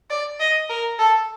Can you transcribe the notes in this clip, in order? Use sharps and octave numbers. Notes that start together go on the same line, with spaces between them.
D5
D#5
A#4
A4